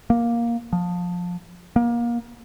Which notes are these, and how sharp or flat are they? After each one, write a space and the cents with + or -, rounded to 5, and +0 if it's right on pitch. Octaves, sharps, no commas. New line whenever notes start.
A#3 +10
F3 +20
A#3 +25